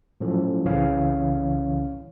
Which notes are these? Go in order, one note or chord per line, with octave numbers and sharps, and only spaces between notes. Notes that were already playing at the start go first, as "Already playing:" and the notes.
A2 F3 F#3 C#4 A4
C2 C#3 E3 C#4 C#5 F5